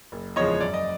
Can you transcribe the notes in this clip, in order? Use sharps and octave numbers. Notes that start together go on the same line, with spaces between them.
F#1
E2 C#3 F3 G#3 C#5 D#5
F#2 D5
D#5